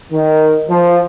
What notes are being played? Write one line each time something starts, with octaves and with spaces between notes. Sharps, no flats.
D#3
F3